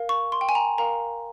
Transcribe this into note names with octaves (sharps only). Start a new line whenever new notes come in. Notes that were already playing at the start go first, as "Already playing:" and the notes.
Already playing: A#4 F5
C#6
C6
G5
G#5
A#5
A#4 F5 A#5